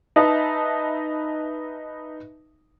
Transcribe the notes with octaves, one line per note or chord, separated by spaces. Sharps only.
D#4 B4 D#5 E5 A5